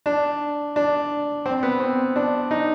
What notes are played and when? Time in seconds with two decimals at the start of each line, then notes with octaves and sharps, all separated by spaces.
0.06 D4
0.76 D4
1.46 C4
1.63 B3
1.80 C4
2.16 D4
2.51 D#4